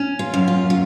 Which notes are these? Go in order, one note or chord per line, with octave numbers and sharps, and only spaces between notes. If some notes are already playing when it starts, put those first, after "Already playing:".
Already playing: C#4
F4
F#2
F4
F4